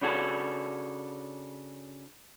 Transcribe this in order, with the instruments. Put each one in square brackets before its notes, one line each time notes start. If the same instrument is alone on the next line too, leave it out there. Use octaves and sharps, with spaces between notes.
[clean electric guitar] C#3 D4 F#4 G#4 A4